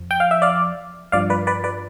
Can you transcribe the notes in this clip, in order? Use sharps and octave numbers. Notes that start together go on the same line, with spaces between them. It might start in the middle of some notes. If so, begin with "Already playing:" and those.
Already playing: F2 F3
G5
F5
E5
D5 F5
G2 F3 D5 F5
B4 D5
B4 D5
B4 D5